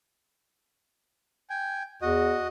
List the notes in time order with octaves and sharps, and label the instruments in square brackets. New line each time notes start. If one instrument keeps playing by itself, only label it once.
[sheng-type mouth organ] G5 G#5
[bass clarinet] E2 [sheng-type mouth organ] F#4 D#5